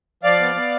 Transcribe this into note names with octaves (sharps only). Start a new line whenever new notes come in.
F3 D5 F5
B3
B3